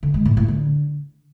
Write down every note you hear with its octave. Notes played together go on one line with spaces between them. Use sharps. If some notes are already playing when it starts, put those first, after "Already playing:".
D3
G#3
A2
A2
D3